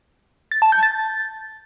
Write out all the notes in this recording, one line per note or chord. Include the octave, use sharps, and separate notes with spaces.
A6
A5
G6
A6